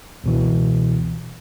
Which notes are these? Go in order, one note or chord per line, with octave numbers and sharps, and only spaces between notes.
C#2 B2 E3